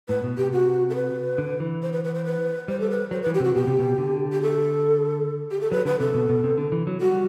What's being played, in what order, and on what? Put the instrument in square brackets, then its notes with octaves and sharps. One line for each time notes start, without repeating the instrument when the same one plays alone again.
[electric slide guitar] A2 [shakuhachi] B4
[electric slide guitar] B2
[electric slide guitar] C3 [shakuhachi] G4
[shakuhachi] F#4
A4
B4
[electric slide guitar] D3
E3
[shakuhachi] C5
B4
B4
C5
B4
[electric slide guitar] G3 [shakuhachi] C5
[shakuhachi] A4
B4
[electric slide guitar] F#3 [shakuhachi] C5
[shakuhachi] B4
[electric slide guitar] E3
[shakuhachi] G4
[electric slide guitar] C3 [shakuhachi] F#4
[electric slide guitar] B2 [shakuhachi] G4
[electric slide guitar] C3
B2
D3
[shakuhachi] G4
A4
G4
A4
[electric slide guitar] F#3 [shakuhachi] B4
[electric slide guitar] D3 [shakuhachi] B4
[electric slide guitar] C3 [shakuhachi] A4
[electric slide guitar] B2
B2
C3
D3
E3
F#3
[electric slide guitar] G3 [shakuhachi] F#4